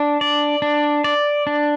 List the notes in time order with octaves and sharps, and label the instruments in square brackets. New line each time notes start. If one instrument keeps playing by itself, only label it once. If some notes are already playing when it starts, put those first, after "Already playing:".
Already playing: [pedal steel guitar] D4
D5
D4
D5
D4